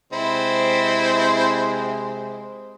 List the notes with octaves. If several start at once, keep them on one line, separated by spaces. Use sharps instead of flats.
C3 G#3 C4 E4 C5